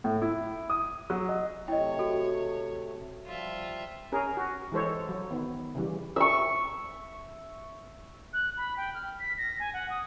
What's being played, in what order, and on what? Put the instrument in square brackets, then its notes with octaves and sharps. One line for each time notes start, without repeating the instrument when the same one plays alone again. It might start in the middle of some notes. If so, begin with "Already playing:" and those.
[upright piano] A2
E4
D#6
F#3
D#5
[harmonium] C3 A3 [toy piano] E4 D#5 [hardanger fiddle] C#5 [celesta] G5
[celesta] F#4 [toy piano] A4
[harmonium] F3 G3 [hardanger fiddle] F4 E5
[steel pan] C#4 G#4 A#4
F#4
E3 G#3 A4 C5 C#5
F#3
D#3 B3
C#3 E3 G3
[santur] E5 C#6
[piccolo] F#6
B5
G5
F6
B6
A#6
G#5
F#5
D#6